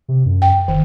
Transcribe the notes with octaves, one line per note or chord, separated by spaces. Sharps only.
C3
F#2
G5
F#1 D#3